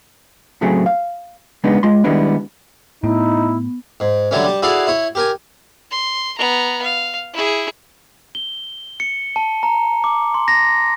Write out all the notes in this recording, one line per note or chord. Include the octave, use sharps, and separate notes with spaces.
A2 C#3 F#3 A3 C4 G#4
F5
C#3 G#3 B3 D4 D#4
G#3 F4 C6
D#3 G3 G#3 B3 D4 E4
A2 B3 D#4 E4
G#2
D3 F#3 G3 A3 C#4
G3 A5
E4 F#4 G#4 A4 D5 F5
E4 C#5
G4 A#4 G#5
C6
B3 A#5
F5
E4 G#4
G7
C#7
A5
A#5
D6
C6
A#6